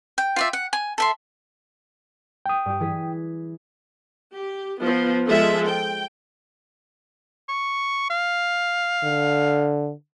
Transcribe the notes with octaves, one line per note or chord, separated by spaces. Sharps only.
G5
F4 D5 E5
F#5
G#5
A4 E5 C6
G5 D#6
G2 G4
E3 G#4 B6
G4
F3 B3
F3 G#3 A4 E5
G5
C#6
F5
D3